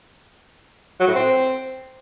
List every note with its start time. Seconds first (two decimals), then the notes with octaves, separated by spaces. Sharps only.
1.00 F#3
1.08 A2
1.16 C4